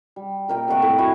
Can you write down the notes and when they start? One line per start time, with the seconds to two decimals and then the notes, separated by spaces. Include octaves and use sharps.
0.16 G3
0.48 A#2 A#4 G5 A#5
0.68 C3 A3 F#5 C#6
0.82 A2
0.98 E4 F#4 G#5 C#6